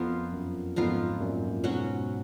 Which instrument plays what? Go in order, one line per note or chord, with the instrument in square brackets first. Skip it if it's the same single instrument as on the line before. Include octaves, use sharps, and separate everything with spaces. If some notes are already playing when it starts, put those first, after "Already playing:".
Already playing: [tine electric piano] F2 [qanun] F3 B3 F4 A#4
[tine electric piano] F#2
[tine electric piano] F2 G#2 [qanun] F3 B3 F4 A#4
[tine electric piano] F#2 A#2
[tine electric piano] G#2 B2 [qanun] F#3 C#4 F#4